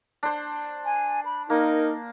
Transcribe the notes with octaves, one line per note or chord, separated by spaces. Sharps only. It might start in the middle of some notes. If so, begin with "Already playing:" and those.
D4 C5
G#5
B5
A#3 D#4 A#4